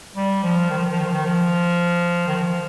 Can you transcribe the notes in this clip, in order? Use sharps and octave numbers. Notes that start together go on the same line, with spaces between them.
G3
F3
D#3
F3
D#3
F3
D#3
F3
D#3
F3
D#3
F3